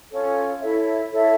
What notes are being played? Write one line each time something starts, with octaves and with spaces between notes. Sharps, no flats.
C#4 F4 A4 C#5
E4 A4 C#5 E5
E4 A4 C#5 E5